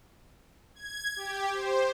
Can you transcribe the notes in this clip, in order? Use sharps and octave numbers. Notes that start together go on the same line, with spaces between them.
G#6
G4
C5